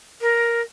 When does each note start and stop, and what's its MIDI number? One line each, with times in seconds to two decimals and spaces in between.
0.21 0.61 70